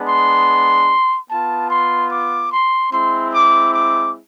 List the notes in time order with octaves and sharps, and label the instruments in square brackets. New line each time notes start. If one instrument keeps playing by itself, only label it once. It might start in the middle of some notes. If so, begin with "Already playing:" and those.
Already playing: [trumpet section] G#3 B3 D4
C6
B3 A5
F4
C6
D6
C6
G#3 C4 E4 C6
D6
D6